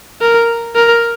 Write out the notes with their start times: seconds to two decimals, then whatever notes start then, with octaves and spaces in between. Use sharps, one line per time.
0.21 A#4
0.75 A#4